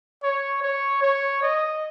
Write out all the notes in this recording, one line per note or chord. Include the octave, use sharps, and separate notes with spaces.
C#5
C#5
C#5
D#5